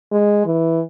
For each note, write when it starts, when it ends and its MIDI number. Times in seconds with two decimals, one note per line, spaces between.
0.12 0.43 56
0.46 0.82 52